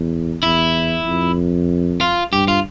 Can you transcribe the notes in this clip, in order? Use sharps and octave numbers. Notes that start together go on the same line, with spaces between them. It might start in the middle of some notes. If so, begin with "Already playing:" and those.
Already playing: E2
E2 E4
F2
F4
G2 G4
F4